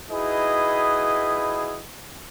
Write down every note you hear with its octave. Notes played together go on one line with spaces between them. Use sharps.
D#4 E4 F#4 G#4 B4 D#5